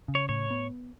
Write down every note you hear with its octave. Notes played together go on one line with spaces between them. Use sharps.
C#3
C#5
A2 C#5
B3